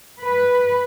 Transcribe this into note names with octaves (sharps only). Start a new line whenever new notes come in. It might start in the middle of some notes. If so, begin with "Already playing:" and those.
B4